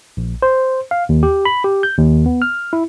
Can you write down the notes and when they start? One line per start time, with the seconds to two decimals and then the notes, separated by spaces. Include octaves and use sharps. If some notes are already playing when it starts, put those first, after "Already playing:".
0.17 A#1
0.42 C5
0.91 F5
1.09 D#2
1.23 G4
1.45 B5
1.64 G4
1.83 G6
1.97 D#2
2.26 B3
2.42 F6
2.73 E4